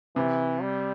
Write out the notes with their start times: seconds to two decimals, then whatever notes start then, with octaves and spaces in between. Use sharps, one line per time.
0.16 C3 E3
0.62 G3